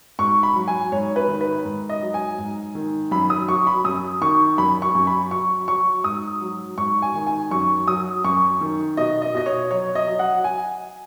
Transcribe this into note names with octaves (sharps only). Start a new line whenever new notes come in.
G#2 C#6
B5
F#3
G#5
G#2 C#5
B4
D#3
B4
G#2
D#5
F#3
G#5
G#2
D#3
F#2 B5
D#6
F#3 C#6
B5
F#2 D#6
D#3 C#6
F#2 B5
C#6
F#2
B5
F#3 C#6
F#3 C#6
G#2 D#6
F#3
G#2 C#6
G#5
D#3
G#5
F#2 C#6
F#3 D#6
F#2 C#6
D#3
B2 D#5
D#5
B2 D#5
C#5
F#3 C#5
D#5
F#3
F#5
G#5